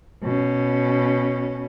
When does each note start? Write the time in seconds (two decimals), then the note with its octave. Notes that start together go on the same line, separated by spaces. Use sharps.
0.23 B2 C#4